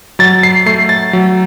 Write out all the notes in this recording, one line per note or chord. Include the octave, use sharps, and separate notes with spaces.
F#3 A6
C7
A3 C7
A6
F#3